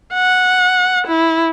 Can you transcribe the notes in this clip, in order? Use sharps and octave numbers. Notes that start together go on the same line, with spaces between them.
F#5
E4